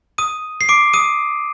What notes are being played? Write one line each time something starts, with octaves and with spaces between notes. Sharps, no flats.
D#6 D#7
C7
D6 D7
D#6 D#7